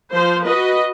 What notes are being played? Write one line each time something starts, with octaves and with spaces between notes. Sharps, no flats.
F3 C5
F#4 B4 D#5